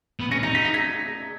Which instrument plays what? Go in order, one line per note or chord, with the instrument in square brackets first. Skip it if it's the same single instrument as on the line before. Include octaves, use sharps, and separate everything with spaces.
[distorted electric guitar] B3
[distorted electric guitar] C#4 [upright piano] A#6 C#7
[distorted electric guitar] D#4 [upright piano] A#6 C#7
[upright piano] B6
A#6
G#6 B6